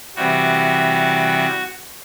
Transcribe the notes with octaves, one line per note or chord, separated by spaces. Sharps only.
C3 E3 G3 F#4